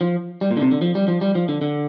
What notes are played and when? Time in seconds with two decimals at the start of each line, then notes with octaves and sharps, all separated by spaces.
0.01 F3
0.41 G3
0.51 A#2
0.57 D3
0.61 C3
0.71 D3
0.82 F3
0.95 G3
1.08 F3
1.21 G3
1.35 F3
1.49 D3
1.61 D3